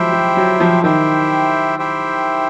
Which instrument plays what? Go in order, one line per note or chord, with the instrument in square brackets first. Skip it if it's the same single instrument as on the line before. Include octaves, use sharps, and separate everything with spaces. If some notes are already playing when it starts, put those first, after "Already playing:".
Already playing: [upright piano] F3 F#3 G#3 [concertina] E4 G4 C5 E5 G5
[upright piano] F3
F#3
F3
[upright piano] D#3 [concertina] E4 G4 C5 E5 G5
[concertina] E4 G4 C5 E5 G5